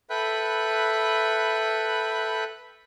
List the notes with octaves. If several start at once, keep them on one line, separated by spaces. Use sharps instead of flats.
A4 B4 E5 G5 B5 F#6